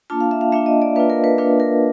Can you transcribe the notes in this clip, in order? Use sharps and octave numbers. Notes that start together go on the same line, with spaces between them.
A#3 D4 F4 A5
F5
E5
F5
A#3 D4 F4 E5
D#5
D5
A#3 D4 F4 B4
A#4
B4
A#3 D4 F4 B4
A#4